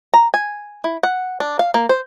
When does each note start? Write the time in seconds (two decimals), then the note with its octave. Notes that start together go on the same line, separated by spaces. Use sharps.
0.14 A#5
0.34 G#5
0.84 E4
1.03 F#5
1.40 D4
1.59 F5
1.74 A#3
1.89 C5